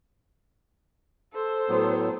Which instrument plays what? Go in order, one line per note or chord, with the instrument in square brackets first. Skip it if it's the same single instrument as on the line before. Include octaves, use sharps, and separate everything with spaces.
[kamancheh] A4 C5
[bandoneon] A2 F#3 B3